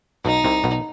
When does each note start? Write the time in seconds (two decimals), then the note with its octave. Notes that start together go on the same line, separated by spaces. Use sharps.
0.25 B1 B2 D#4
0.44 C2 C3
0.64 B1 B2